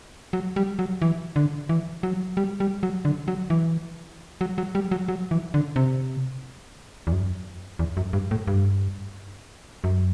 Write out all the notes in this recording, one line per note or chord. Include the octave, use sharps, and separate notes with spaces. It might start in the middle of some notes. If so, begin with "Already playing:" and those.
F#3
G3
F#3
E3
D3
E3
F#3
G3
G3
F#3
D3
F#3
E3
F#3
F#3
G3
F#3
F#3
E3
D3
C3
E2
F#2
E2
F#2
G2
A2
G2
F#2